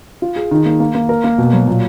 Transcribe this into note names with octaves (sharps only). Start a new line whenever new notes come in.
F4
G#4
D#3
A#3
A#3
A#3
A#4
A#3
B2
F#3
A#2